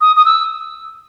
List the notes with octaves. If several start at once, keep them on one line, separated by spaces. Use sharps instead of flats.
D#6
D#6
E6